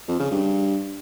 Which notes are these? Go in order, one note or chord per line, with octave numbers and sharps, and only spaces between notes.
F2
C#3
G2